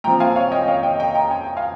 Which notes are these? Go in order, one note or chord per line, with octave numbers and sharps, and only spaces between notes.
A#2 F3 C4 G5 A#5
F5 G#5
C#5 F5
D#5 G5
C#5 F5
D#5 G5
D#5 G5
G5 A#5
G#5
G5
F5 G#5